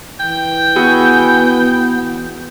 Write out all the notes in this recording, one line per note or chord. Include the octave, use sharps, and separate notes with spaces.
E3 G5
B3 E4 F#4 G#4